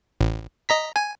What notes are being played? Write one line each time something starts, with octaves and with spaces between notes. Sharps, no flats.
A1
D#5 A#5 B6
G#5